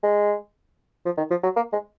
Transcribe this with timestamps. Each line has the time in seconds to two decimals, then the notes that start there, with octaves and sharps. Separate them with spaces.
0.03 G#3
1.05 F3
1.17 D#3
1.30 F3
1.43 F#3
1.56 A#3
1.72 G#3